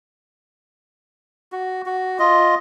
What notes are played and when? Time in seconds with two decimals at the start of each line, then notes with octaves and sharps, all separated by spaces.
1.52 F#4
1.86 F#4
2.19 F4 D#5